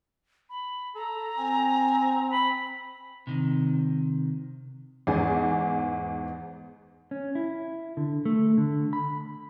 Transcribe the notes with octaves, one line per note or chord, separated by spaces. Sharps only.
B5
A4 A#5
C4 G#5
B5 F#7
C3 D#3
E2 G#2 G#5
C#4
E4
D3
A3
D3
B5